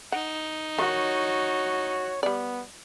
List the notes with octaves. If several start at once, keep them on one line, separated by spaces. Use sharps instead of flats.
D#4 F#5
D#3 F#4 C#5
G3 B3 D5